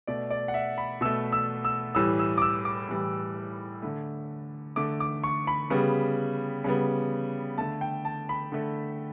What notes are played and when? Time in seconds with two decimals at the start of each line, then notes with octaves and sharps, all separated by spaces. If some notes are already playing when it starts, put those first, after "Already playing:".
0.07 B2 A3 D5
0.30 D5
0.48 F#5
0.54 E5
0.78 B5
1.01 B2 A3 E6
1.32 E6
1.65 E6
1.95 A2 E3 G3 E6
2.19 E6
2.38 D6
2.42 E6
2.65 D6
2.89 A2 E3 G3
3.82 D3 A3
4.76 D3 A3 D6
5.00 D6
5.24 C#6
5.47 B5
5.70 C#3 G3 B3
6.64 C#3 G3 B3
7.58 D3 A3 A5
7.81 G5
8.05 A5
8.29 B5
8.52 D3 A3